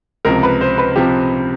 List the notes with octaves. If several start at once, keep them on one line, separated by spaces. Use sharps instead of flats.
C#2 C3 F3 A#4
B4
C5
B4
C3 F3 G4